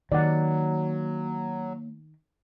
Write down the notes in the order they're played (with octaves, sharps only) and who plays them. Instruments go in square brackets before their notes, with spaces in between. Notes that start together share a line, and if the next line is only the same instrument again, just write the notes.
[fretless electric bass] D#3 [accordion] F#3 [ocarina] A#3 [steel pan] D5 F#5